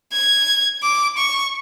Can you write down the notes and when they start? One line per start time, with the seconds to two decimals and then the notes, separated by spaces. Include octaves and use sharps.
0.13 G#6
0.83 D6
1.18 C#6